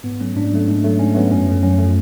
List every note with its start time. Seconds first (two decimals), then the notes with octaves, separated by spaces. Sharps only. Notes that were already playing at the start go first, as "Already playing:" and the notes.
0.04 G#2 B3
0.20 F#3 A3 C#4
0.35 G#2 D4
0.52 F#3 A3
0.67 G#2
0.84 F#3 A3
0.99 G#2 C#4
1.15 F#3 A3 B3
1.31 F#2 C#4
1.47 F3 A3
1.62 F#2 C#4
1.78 F3 A3